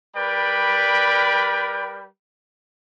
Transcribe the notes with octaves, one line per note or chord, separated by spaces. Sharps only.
G3 A#4 B4 D5 G5 B5